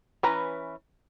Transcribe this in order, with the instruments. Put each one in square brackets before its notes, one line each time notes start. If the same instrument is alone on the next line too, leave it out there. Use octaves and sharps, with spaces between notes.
[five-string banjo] E3 C#4 B4 A#5